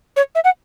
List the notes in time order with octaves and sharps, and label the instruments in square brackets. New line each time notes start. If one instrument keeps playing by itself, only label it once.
[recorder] C#5
E5
F#5